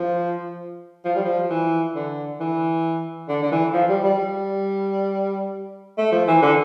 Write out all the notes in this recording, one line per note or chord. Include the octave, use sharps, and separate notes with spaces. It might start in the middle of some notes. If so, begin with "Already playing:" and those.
Already playing: F3
F3
G3
F3
E3
D3
E3
D3
D3
E3
F3
G3
G3
G3
A3
F3
E3
D3